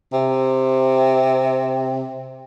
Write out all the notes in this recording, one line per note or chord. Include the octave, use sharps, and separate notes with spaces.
C3